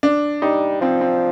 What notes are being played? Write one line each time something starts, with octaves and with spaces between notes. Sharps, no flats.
D4
G3 D#4
F3 C4
C4